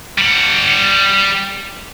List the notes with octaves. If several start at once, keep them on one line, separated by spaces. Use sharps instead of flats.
G3 F#5